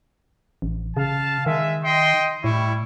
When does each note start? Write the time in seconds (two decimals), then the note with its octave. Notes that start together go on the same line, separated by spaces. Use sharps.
0.62 A1
0.97 C#3 F5 A5
1.46 D#3 G#3 E5
1.84 D#5 G5 C6
2.44 A2 G3 E4 C#6